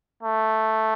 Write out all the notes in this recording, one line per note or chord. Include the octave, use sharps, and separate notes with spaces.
A3